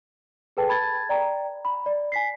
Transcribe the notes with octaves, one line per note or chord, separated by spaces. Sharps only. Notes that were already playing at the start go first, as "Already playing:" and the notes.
G#4 A4 B4 G5 A5
A5 B5 G#6 A6
D5 G5 A#5
B5
D5
G#5 B6 C7